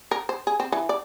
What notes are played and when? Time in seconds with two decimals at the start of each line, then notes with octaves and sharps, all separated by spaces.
0.11 A#4
0.29 C5
0.47 G#4
0.60 C4
0.72 E3
0.89 D5